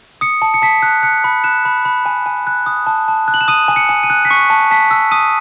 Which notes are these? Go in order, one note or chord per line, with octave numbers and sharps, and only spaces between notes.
D#6 C#7
A5
C#7
A5 B6
F#6
F#6 C#7
B5
F#6 E7
B5
B5
G#5
G#5
F#6
D#6
A5
A5
F#6
F#7
E7
D#6 D#7
G#5
C#7
G#5
D#7
F#6
B6
C#6 C#7
A5
A5 B6
E6
D#6 D#7